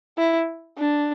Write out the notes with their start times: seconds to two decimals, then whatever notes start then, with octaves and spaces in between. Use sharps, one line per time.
0.18 E4
0.78 D4